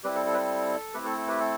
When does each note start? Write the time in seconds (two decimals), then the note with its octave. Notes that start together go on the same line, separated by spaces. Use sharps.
0.04 G3 C4 E4 G4 B4
0.16 A4
0.26 A4
0.34 B4
0.38 A4
0.94 A3 C4 E4 G4 B4
1.05 A4
1.17 A4
1.28 G4 B4
1.40 A4